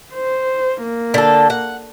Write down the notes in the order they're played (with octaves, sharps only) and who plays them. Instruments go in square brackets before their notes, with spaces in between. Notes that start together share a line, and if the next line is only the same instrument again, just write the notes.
[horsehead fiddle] C5
A#3
[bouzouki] D3 A4
F#5